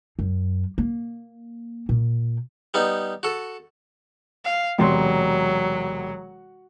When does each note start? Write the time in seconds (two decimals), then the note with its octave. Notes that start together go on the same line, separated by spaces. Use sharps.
0.19 F#2
0.78 A#3
1.89 A#2
2.74 G3 B3 D#4
3.23 F#4 A4
4.45 F5
4.79 E1 C3 F#3 C6